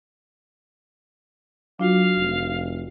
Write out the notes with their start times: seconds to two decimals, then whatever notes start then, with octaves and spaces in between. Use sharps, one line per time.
1.80 F#3 D4 F4 F#4 F5
2.18 F1